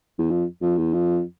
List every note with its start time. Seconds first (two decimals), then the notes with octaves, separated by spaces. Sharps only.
0.19 E2
0.30 F2
0.62 F2
0.77 E2
0.93 F2